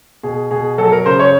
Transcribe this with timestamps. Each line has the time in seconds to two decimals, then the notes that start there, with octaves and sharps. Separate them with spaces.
0.23 B2 G#4
0.51 B2 G#4
0.78 F#3 A4
0.92 A#4
1.06 C#3 C5
1.19 C#5